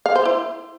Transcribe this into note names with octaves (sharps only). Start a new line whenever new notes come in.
F5
C5
E4